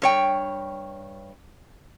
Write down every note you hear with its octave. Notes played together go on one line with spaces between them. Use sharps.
G2 C#5 G5